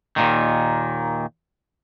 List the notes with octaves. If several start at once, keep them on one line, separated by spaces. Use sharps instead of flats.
D#2 A#2 D#3